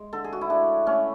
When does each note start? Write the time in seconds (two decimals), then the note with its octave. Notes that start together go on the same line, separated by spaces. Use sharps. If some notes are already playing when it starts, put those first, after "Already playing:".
Already playing: G#3
0.13 D3 A4
0.24 G#4
0.33 F#4
0.41 E4
0.50 G#3 D4
0.87 A3 C#4